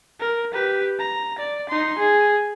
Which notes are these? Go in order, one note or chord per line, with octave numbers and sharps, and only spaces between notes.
A#4
G4 B4
A#5
D5
D#4 C6
G#4